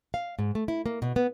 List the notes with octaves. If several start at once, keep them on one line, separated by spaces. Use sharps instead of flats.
F5
G#2
A3
E4
A#3
B2
B3